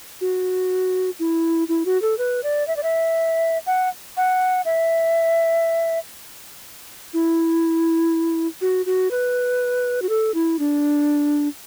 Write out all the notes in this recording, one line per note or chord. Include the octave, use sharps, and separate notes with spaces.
F#4
E4
E4
F#4
A4
B4
D5
E5
D5
E5
F#5
F#5
E5
E4
F#4
F#4
B4
F#4
A4
E4
D4